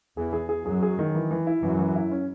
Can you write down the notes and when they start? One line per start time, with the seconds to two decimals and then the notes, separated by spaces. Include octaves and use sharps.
0.16 E2 E3 G#4
0.33 G#4
0.49 G#4
0.66 F#2 F#3 G#4
0.82 G#4
0.99 D#3
1.15 E3
1.31 E3
1.47 E4
1.63 F#2 E3 F#3
1.79 E3
1.96 E4
2.11 C#4